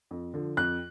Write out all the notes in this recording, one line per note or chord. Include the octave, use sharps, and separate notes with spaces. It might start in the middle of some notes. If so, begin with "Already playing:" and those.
F2
D3 F3
F2 F#6